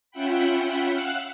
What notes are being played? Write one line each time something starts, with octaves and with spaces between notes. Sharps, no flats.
C#4 F4 E5 F#5 G5 B5
F5 F#5 E6 F#6